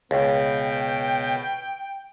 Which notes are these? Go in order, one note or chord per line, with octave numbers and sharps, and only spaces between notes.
C#2 B2 G5